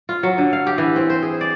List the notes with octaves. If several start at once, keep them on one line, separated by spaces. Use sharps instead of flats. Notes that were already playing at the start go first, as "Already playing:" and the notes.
F4
F#3
D3
F5
G4
E3
C4
C5
G#4
D5